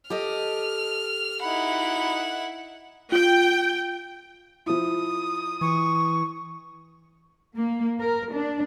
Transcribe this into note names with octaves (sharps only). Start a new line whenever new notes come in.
G4 A4 D#5 F6
D#4 E4 F#5 B5
F4 G5
F3 E4 D#6
E3 C#6
A#3
A#4
D4